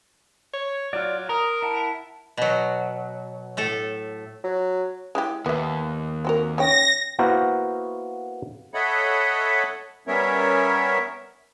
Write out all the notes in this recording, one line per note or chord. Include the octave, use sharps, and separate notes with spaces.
C#5
F#3 F4 D5
A#4 A#5 D#6
E4 F#5 A5
B2 F#3
A2 A3 A4
F#3
G#3 E4 G4
D#2 B3 E5
C4 F#4 A#4
C#3 C#5 G5 A#6
A#3 B3 E4 F#4 A#4 C5
A4 C#5 D#5 E5 F#5 B5
G3 B3 C#4 A#4 C#5 E5